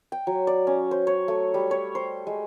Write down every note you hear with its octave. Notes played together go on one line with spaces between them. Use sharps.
G5
F#3
D5
C#4
C5
C#5
A3
G3
C#5
C5
G#3